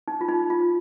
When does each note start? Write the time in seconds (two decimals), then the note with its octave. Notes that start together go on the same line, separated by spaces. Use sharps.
0.08 D#4
0.21 F4
0.29 D#4
0.50 F4